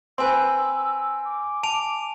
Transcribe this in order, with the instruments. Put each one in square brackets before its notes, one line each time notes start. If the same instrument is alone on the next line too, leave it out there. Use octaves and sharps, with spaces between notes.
[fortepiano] C4 B4 [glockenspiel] G#5 C6 [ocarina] E6
[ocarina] D6
[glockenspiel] A5 D7 F7